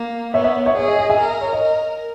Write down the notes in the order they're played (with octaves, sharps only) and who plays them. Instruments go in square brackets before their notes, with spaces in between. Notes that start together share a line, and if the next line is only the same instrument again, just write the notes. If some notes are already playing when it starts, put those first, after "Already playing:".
Already playing: [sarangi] A#3
[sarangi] B3 [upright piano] C#5 E5
[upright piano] C#5 E5
C#5 E5
[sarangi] G#4 [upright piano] C#5
[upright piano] D#5
D#5
E5 G#5
[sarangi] A#4
[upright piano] C#5
D#5
[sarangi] A#4